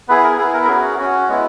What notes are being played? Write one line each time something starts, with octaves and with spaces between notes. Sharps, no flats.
B3 E4 G#4 B4
A#4
B3 E4 G#4
A#4
A#4
C#4 F#4 G#4
C#4 F#4
G#3 B3 E4